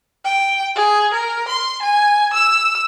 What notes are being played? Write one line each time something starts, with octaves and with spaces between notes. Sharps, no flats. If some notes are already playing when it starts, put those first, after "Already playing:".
G5
G#4
A#4
C6
G#5
E6